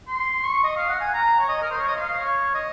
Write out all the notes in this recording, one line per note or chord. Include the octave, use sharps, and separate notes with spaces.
C6
C#6
D#5
F5
F#5
G#5
A#5
C#5
D#5
A#4
C5
C#5
D#5
F5
C#5
D#5